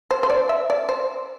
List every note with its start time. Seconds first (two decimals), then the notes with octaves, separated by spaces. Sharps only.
0.11 C5
0.23 C5
0.30 D5
0.49 E5
0.70 D5
0.89 C5